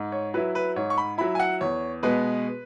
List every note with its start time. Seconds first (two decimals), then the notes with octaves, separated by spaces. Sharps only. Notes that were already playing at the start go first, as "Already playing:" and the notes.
Already playing: G#2
0.12 C#5
0.34 F#3 E4 B4
0.55 B4
0.76 G#2 C#5
0.90 C#6
0.98 B5
1.18 F#3 E4 B5
1.35 G#5
1.40 F#5
1.61 E2 C#5
2.03 B2 G#3 B3 B4